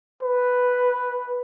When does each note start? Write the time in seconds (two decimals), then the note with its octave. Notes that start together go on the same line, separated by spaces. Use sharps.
0.23 B4